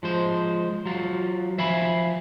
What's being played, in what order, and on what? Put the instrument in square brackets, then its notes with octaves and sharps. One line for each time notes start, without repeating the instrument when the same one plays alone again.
[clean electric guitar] F3 G#3 C5
F#3 F4
F3 E5 F5 G#5 B5